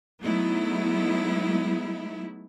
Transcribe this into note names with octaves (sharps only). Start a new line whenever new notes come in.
F#3 G#3 A3 B3 D#4 E4